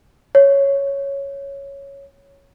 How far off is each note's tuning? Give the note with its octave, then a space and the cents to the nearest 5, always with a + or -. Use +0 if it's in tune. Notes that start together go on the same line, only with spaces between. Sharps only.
C#5 +0